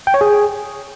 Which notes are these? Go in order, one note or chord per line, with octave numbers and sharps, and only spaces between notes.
G5
C#5
G#4